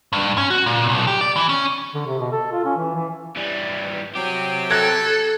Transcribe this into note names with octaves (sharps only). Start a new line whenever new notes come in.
G2
C#4
F#4
A#2
B1
G4
D5
E3
C#4
D3
C3
B2
A4
F4
C#4
E3
E3
E3 G3
F#3 C4 G4 G5
A4 F#6 G#6 A#6